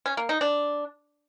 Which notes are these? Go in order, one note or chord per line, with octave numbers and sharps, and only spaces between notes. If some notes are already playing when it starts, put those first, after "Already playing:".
C#4
A#3
D#4
D4